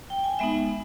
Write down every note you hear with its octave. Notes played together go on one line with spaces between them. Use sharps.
G5
G#5
G#3 B3 D#4 E5